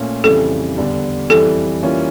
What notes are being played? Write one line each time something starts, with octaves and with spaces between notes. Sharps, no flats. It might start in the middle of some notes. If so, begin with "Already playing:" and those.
Already playing: A#2 A3 C#4
F2 C#3 E3 G3 A4
E2 D3 G3
F2 E3 G3 A4
E3 G3 A#3 C#4 F4